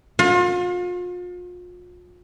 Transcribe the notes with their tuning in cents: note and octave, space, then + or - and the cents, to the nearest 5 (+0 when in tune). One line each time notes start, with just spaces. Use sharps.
F4 +40